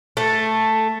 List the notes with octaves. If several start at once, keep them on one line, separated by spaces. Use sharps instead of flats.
A3